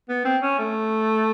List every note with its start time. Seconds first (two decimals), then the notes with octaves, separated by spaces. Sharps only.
0.09 B3
0.25 C4
0.42 C#4
0.59 A3